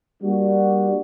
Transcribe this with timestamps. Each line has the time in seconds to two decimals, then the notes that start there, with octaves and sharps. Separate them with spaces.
0.22 G3 A#3 D4 F#4